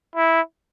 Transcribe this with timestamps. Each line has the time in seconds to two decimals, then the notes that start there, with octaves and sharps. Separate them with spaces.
0.16 E4